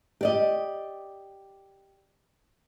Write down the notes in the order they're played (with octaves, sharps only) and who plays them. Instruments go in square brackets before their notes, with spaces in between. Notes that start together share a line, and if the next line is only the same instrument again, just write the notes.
[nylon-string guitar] G4 D5 D#5